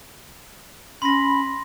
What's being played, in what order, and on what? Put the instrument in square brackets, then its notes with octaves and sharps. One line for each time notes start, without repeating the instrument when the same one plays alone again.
[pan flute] C#4 [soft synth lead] B5 [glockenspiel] C6 A#6